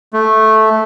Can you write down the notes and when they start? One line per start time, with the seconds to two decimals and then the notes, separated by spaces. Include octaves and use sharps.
0.13 A3